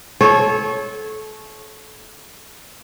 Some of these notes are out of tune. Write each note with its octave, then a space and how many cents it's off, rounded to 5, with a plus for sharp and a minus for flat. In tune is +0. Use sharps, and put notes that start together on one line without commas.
A4 -30 C#5 -10